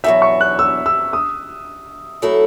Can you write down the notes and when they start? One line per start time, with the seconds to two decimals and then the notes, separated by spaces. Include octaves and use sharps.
0.04 E2 B2 F#3 E5
0.22 C#6
0.41 F#6
0.59 E6
0.86 E6
1.13 D#6
2.22 F#3 A3 E4 A4